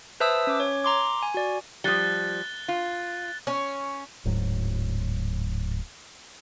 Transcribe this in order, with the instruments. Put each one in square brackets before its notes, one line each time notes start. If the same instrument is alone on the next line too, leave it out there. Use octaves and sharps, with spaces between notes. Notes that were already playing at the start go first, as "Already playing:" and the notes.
[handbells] B4 C5 E5 A5 D#6 E6
C#4 D6
C#5
A#5 C6 D6
G#5
F#4 D5
[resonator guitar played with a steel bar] F3 G3 [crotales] F#6 A6 G7
[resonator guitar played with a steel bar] F4
[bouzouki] C#4
[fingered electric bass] D1 G#2 F#3